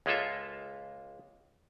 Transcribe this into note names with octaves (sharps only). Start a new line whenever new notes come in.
C#2 G#3 A#3 F4 A4 E5